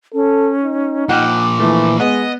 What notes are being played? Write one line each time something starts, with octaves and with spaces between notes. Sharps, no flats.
C#4 A4
D#4
A#2 F3 F#5 G5 D6 F6
E3 A3
G#3 B3 D#5